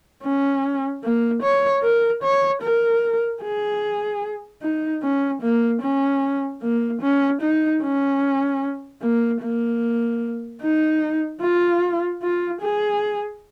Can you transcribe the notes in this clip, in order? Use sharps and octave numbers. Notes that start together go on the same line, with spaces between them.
C#4
A#3
C#5
A#4
C#5
A#4
G#4
D#4
C#4
A#3
C#4
A#3
C#4
D#4
C#4
A#3
A#3
D#4
F4
F4
G#4